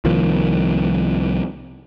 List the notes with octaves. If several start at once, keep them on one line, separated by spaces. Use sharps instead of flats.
C2 D#3 F3 A#3